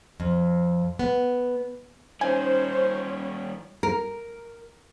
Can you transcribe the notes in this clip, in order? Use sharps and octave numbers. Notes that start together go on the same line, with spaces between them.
F2
B3
D#3 G3 C#4 D#4 C5 C#5 G#5
A#4